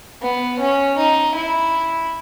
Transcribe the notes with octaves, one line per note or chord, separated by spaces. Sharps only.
B3
C#4
D#4
E4